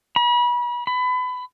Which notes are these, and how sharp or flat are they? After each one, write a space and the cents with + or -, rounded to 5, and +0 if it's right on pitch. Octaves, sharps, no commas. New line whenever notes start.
B5 -35
B5 +25